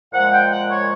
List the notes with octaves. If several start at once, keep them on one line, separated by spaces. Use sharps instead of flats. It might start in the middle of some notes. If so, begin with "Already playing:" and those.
A#2 F3 G#3 F#5
G5
F#5
C#5